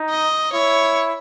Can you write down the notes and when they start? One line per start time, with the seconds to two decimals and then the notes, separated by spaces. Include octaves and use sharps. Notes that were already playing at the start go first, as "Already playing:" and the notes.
Already playing: D#4
0.10 D#5
0.52 E4 C#5